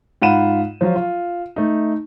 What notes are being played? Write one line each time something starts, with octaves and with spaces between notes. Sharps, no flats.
G#2 F4 F#5 B5 D#7 E7
F3 F#3 F4
F4
A3 D#4